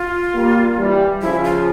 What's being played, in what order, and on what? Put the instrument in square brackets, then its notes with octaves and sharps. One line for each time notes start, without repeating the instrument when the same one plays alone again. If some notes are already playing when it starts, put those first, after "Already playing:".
Already playing: [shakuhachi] F4
[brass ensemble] G3 A#3
E3 G3
[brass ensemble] C#3 F3 [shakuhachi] E4
[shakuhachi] F4